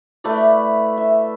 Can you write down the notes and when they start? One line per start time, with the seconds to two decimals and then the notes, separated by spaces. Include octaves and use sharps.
0.24 A3 E4 B4 D5
0.97 E5